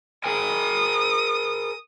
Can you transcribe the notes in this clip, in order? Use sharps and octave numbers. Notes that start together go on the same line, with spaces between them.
G#4 A#4 G#5 D#6